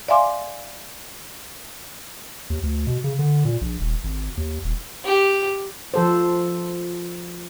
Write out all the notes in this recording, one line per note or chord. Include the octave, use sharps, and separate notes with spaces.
D5 E5 F5 G#5 C6 D6
D#2
D2
B2
C#3
D3
A#2
A#1
D#1
G#1
D#2
D#1
G4
F3 A4 C5